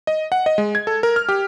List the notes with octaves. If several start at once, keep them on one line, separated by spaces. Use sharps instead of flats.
D#5
F#5
D#5
G#3
G#6
A4
A#4
F6
G4